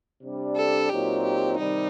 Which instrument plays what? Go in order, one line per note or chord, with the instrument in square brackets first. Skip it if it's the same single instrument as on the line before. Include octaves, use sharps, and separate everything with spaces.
[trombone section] C3 G3 D4
[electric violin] A4
[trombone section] A#2 F#3 C4 D#4 [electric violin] G4
[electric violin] G4
[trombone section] C3 D#3 G3 [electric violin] D#4